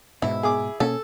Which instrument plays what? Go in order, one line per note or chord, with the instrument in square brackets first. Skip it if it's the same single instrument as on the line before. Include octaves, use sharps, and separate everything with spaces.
[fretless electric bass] G#2 B2 [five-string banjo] E4
[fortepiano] G#4 D6
[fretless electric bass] B2 A#3 C#4 [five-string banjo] A4